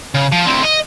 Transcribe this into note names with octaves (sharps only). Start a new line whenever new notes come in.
C#3
F3
D2 C4
D#5